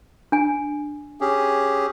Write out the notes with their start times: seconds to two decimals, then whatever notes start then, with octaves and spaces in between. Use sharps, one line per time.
0.32 D4 G#5
1.21 C#4 G4 G#4